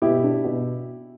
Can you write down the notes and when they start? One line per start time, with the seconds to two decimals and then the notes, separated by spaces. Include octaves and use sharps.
0.02 B2 E4 G4
0.24 D4
0.44 B2